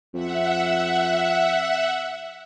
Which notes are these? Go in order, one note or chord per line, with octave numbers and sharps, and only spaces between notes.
F2 E5 F#5